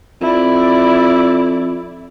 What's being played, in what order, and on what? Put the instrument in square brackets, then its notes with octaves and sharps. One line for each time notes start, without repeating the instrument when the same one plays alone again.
[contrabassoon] F2 [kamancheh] E4 D5